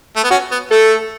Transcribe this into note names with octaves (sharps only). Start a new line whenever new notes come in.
A3
B3
C#4 F#4
B3
A3 A4